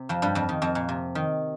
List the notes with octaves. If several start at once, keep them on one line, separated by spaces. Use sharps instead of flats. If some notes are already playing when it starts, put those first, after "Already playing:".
Already playing: C3
F2 F3
G2 G3
F2 F3
D#3
F2 F3
A#2
C3
D#3